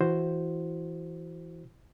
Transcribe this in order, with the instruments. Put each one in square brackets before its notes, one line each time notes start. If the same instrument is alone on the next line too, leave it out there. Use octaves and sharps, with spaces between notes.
[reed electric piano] E3 E4 F#4 C5